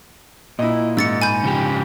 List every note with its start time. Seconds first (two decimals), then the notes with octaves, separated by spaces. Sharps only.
0.59 A#2 E4 D#5
0.97 G#2 E6 A6 C#7
1.22 G#5 B5 G6
1.44 C#3 F3 G4